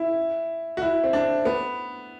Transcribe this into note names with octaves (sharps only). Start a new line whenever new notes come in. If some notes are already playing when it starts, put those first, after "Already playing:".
Already playing: E4
F#4
E4
C4
D4
B3